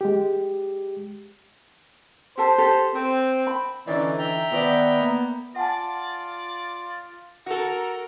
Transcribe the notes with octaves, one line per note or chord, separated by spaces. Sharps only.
G#3 G4
G4 A4 C5 A5
G4 A4
C4 C5
B5
D3 E3 C#4 D#4 E4 D5
E5 G5 A#5
D#3 B3 B4 D5
A#3
F4 D5 F#5 G#5 A5
F#4 A4 A#4